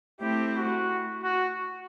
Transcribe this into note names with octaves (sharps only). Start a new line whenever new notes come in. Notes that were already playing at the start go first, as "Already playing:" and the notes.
A3 C4 E4 G4
F#4
F#4